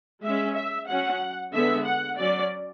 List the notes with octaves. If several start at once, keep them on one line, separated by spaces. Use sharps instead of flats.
G#3 C#4 E5
E5
F#3 C#4 F#5
D3 G#3 B3 E5
F#5
F#3 C#4 D5